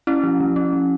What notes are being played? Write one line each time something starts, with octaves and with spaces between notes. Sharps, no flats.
C#4 E4
F3
F3
C#4
F3